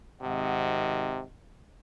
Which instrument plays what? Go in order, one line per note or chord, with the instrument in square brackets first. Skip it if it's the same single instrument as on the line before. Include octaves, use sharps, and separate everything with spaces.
[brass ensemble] G#1 D#5 F#5 [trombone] C3